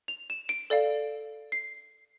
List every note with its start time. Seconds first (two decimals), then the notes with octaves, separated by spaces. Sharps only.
0.08 F7
0.30 E7
0.49 D7
0.70 A4 D5 F5
1.52 C7